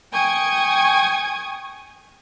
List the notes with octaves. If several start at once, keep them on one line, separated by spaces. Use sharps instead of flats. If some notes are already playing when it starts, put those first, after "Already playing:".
G5 G#5 C#6 D#6 G#6